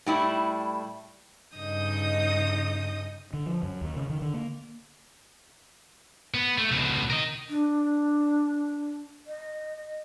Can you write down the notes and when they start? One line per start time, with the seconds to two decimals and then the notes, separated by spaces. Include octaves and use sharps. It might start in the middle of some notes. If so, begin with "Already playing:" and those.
0.06 A2 G3 E4
1.55 G2 C#3 D#4 D#5 D#6 G6
3.33 D3
3.46 F3
3.63 F#2
3.81 D#2
3.96 C#3
4.10 D#3
4.22 D3
4.34 A#3
6.34 B3
6.58 A3
6.72 C#2 B2
7.10 A#4 D#5
7.49 D4
9.27 D#5